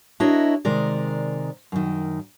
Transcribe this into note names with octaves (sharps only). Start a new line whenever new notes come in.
D4 E4 F#4 A#4 C#5 D#5
C3 D#3 G#3 A#4 D5
F#2 D#3